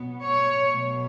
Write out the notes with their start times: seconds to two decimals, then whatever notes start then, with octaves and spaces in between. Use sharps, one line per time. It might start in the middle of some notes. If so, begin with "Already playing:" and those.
Already playing: B2 F#3 B3
0.24 C#5
0.71 B2 F#3 A3